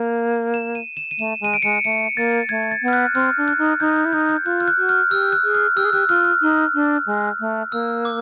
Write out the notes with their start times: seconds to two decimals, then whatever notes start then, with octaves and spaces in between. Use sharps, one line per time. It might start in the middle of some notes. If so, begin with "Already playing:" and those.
Already playing: A#3
0.54 E7
0.75 D#7
0.97 E7
1.11 D#7
1.18 A3 E7
1.41 G#3 D#7
1.54 D7
1.62 G#3 C#7
1.85 A3 C#7
2.16 A#3 A6
2.49 A3 G#6
2.71 A6
2.83 B3
2.88 F6
2.93 F#6
3.14 C4 F6
3.37 D4
3.48 F#6
3.58 D#4
3.80 D#4 G6
3.96 G6
4.05 E4
4.12 D#4 G6
4.29 G6
4.45 F4 F#6
4.60 F6
4.68 F#6
4.78 F#4
4.89 F6
5.11 G4 E6
5.32 F#6
5.44 G#4
5.55 F6
5.76 G4 E6
5.85 G#4
5.92 G4 F#6
6.09 F4 F6
6.25 F6
6.42 D#4
6.75 D4
7.06 G#3
7.40 A3
7.72 A#3 E6
8.05 D6